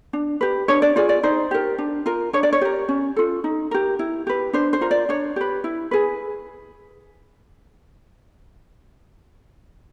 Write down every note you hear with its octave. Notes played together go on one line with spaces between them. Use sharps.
D4
G4 B4
D4 C#5
D5
F4 G#4 D5
D5
D#4 C5
G4 A#4
D4
F4 A#4
D4 C#5
D5
C#5
G4 A#4
C#4
F4 A4
D#4
G4 A#4
E4
G4 B4
D4 C5
C5
F4 A#4
D5
D4 C#5
G4 B4
E4
G#4 B4